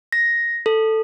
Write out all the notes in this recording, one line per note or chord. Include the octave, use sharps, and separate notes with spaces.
A#6
A4